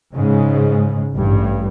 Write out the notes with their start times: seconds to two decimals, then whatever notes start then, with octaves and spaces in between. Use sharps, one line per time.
0.15 G#2 C#3 G#3
1.12 A1 G2